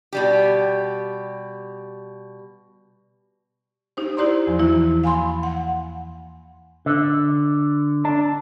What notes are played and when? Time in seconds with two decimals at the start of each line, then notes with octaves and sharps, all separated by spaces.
0.13 B2 G3 G4
3.97 D#4 G4 C5
4.17 E4 G4 C5 D5 A#5 C6
4.47 E2 F3
4.59 E3 A#3 E4 F#4
5.04 F5 G#5 B5 C6
5.43 F#5
6.86 D3
8.05 D4